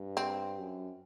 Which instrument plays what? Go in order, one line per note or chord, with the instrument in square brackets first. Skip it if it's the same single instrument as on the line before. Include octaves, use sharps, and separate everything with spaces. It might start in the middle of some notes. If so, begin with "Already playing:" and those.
Already playing: [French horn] G2
[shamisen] C4
[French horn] F#2